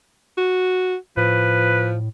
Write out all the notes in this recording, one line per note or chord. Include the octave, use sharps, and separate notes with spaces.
F#4
A2 F3 B4